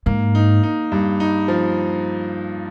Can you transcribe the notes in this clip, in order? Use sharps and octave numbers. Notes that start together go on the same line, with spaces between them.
G#2 A#3
D#4
D#4
G2
D#4
F3